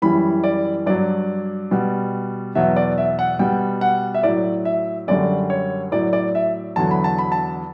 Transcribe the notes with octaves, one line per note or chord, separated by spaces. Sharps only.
F#2 E3 G3 B5
D5
G2 F#3 D5
B2 G3
E2 B2 F#3 E5
D5
E5
F#5
B2 G3 G5
F#5
E5
A2 F#3 D5
E5
F#2 D3 G3 D5
C#5
A2 F#3 D5
D5
E5
E2 D3 F#3 A5
B5
A5
B5
A5